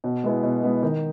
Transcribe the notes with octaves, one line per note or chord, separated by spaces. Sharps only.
B2
G#3 B3 E4
B2
G#3 B3 E4
D#3